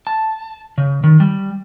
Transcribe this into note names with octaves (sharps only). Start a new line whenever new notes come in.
A5
C#3
D#3
G3